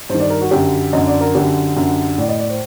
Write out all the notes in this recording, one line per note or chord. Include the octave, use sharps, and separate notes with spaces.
G2 D#3 C5
D5
A#4
F#4
F#2 D3 G4
F#2 D3 D#5
D5
A#4
F#2 D3 G4
F#2 D3
A2 D5
D#5
D5
C5